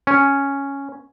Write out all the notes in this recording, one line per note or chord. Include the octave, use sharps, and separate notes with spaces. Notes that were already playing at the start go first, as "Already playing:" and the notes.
C#4